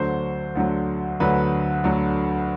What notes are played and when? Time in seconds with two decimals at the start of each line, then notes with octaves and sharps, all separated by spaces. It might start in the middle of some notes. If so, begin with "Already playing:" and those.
Already playing: D2 D3 F#3 C5
0.55 D2 D3 F#3
1.20 D2 D3 F#3 B4
1.84 D2 D3 F#3